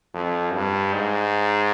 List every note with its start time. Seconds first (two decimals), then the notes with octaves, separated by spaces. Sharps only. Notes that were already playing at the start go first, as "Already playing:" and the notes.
0.14 F2
0.54 G2
0.93 G#2